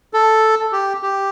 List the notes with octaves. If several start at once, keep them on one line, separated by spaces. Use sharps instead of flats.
A4
G4
G4